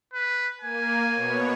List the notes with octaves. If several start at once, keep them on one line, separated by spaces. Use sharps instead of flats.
B4
A#3 G#5
B2 B3 C#5